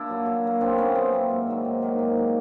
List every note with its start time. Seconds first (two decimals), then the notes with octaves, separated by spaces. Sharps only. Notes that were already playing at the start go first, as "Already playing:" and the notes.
Already playing: A#2 D4 E4
0.09 F#3 A#3
0.26 A#2
0.43 F#3 A#3
0.61 A#2 C4 D4
0.78 F#3 A#3 B3 C#4
0.95 A#2 C4
1.13 F#3 A#3
1.30 G#2
1.47 D#3 F#3 A#3
1.65 G#2
1.82 D#3 F#3 A#3
1.99 G#2
2.17 D#3 F#3 A#3